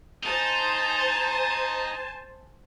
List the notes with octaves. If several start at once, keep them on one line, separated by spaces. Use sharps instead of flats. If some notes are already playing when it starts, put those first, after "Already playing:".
D#4 C5 G#5 A5